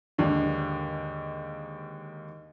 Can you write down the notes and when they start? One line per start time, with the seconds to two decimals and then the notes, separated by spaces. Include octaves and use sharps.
0.18 D#2 G#2 D3 D4